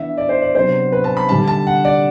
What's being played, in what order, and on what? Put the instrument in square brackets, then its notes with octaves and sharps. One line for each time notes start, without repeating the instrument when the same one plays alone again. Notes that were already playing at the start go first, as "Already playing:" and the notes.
Already playing: [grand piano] E3 B3 D4 E5
D5
C5
D5
C3 F#3 B3 D4 C5
B4
A5
B5
D3 G3 D4 A5
A5
F#5
D5